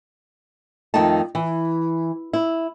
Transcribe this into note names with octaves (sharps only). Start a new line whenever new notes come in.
F2 D#3 A3 D#4 A5
E3
E4